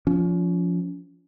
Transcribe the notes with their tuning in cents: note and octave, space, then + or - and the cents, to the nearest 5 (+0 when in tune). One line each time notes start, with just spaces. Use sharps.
F3 +0 C#4 +35